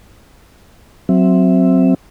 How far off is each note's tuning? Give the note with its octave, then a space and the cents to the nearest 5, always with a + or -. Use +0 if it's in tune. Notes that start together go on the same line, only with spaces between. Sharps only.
F#3 +0 C4 +0 E5 +0